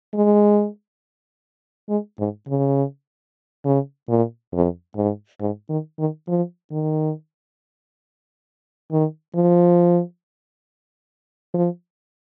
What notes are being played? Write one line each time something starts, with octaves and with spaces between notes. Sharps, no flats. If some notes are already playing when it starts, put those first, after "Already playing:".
G#3
G#3
G#2
C#3
C#3
A#2
F2
G#2
G#2
D#3
D#3
F3
D#3
D#3
F3
F3